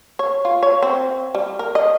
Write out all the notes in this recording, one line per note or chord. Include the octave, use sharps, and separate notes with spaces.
C#5
F4
C#5
C4
G3
A#4
D#5